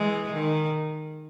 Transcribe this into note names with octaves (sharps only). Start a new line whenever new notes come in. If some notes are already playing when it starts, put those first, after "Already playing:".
Already playing: E3 G#3
D#3